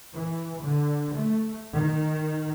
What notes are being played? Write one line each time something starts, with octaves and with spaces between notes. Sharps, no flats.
E3
D3
A3
D#3